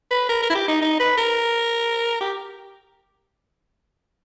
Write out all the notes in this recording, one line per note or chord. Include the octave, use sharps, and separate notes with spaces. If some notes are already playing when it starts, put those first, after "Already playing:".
B4
A#4
A#4
E4
G4
D#4
D#4
B4
A#4
G4